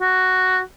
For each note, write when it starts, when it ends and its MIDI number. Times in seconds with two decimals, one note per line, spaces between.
0.01 0.60 66